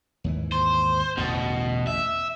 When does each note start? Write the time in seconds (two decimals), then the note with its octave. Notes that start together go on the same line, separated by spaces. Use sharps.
0.24 D#2 G#2 E3
0.52 C5
1.17 A1 E2 B2 D3
1.87 E5